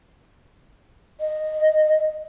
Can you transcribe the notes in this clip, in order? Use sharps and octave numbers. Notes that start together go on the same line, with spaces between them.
D#5